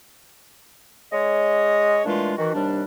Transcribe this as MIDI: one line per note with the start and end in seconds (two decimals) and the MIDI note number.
1.12 2.01 56
1.12 2.01 73
1.12 2.01 75
2.05 2.33 46
2.05 2.33 52
2.05 2.33 56
2.05 2.33 57
2.05 2.33 62
2.05 2.33 65
2.38 2.53 51
2.38 2.53 52
2.38 2.53 66
2.53 2.83 39
2.53 2.83 48
2.53 2.83 55
2.53 2.83 62